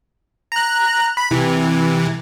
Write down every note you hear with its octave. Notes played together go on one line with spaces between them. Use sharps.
A#5 F#6
B5
C3 E3